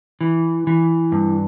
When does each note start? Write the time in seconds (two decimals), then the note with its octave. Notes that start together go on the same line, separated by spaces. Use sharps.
0.21 E3
0.67 E3
1.12 G2